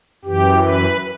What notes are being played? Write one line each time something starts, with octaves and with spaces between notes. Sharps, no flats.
F#2 E3 G4
B4